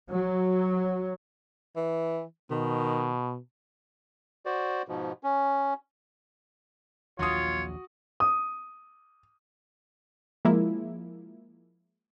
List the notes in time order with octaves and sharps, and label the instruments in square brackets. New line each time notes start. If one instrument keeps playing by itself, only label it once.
[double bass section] F#3
[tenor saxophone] E3
[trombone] B2 [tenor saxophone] D#3
[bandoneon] F#4 C5 D5
G#2 B2 F3
C#4
[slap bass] A#1 D#2 F#3 [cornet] F4 [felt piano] F#4 D#6 [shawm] C#5
[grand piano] D#6
[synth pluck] F3 G#3 A#3 E4